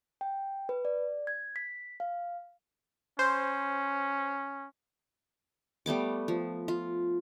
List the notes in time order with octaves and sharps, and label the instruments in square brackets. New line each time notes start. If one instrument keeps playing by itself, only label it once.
[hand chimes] G5
B4
D5
G#6
B6
F5
[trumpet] C#4 [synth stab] C5
[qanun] G3 A3 B3 D6
F3
F4